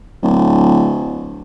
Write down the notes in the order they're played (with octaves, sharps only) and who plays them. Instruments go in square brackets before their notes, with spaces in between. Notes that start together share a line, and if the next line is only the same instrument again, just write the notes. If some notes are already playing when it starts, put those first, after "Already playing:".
[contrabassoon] D1